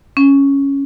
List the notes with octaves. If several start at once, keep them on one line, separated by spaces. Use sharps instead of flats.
C#4